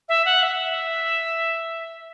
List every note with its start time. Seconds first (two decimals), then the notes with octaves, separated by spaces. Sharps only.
0.09 E5
0.25 F#5
0.43 E5